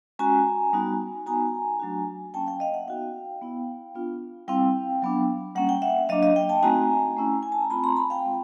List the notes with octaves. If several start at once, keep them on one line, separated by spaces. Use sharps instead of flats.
G#3 C#4 F#4 G#5 A#5
G3 B3 D#4 F#4
B3 D#4 F#4 G#5 A#5
F#3 A3 D4 F#4
F#3 A#3 C#4 G5 A5
F5 G5
D#5 F5
E5 F#5
B3 D#4 F#4 F5 G5
B3 E4
B3 D4 F4
G3 C4 E4 F5 G5
F#3 B3 D4
G3 A#3 C#4 F#5
G5
E5 F#5
F#3 A#3 D4 D#5 F5
D#5 F5
F5 G5
G5 A5
A3 C4 D#4 F#4 G#5 A#5
A3 C#4 E4
G#5
A5
A#5
A3 C4 F4 A5 B5
A#5 C6
A5 B5
F5 G5
G#3 C4 F4